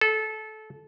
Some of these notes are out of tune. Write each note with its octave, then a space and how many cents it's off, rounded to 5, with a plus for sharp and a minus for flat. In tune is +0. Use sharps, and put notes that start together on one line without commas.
A4 -20